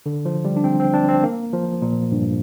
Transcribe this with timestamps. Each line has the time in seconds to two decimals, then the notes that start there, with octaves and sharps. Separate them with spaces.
0.06 D3
0.25 F3
0.45 G3
0.57 D4
0.64 C4
0.80 C4
0.94 D4
1.09 C4
1.23 A#3
1.53 F3
1.82 A#2
2.12 G2